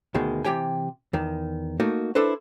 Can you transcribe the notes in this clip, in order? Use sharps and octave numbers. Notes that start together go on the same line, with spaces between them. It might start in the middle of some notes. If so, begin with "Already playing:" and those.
D2 B2 D#3 G#3
C3 E3 G4 G5 G#5
E2 D#3
A3 A#3 D#4 F#4
D4 E4 A4 B4 C5